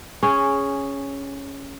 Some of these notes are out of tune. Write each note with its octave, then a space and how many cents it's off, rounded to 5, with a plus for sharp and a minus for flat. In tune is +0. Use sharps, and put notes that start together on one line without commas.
C#4 +0 G#4 -5